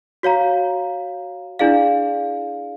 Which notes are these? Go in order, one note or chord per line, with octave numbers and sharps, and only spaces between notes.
F#4 C#5 F5 A#5
D4 E4 G#4 D5 F5